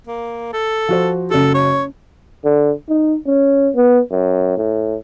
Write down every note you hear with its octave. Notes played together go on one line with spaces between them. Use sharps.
A#3
A4
F3 F#4 C5
F#1 F#4 A4
C#5
D3
D#4
C#4
B3
F#2
A2